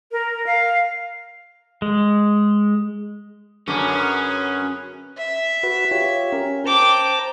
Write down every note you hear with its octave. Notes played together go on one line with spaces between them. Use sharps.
A#4
F5
G#3
F#2 D3 C#4 G#4 B4 D6
E5
F#4 B4
F4 G4 C#5
C#4 A#4
C5 G5 A5 A#5 D6